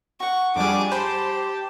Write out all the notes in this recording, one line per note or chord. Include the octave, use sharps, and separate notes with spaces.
F#4 F#5 C#6
F2 G3 D4 G#4 D6
G4 C5 A5 B5